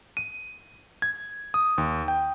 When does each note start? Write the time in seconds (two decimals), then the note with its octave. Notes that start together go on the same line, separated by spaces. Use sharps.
0.17 D#7
1.02 G#6
1.54 D#6
1.78 D#2
2.08 G5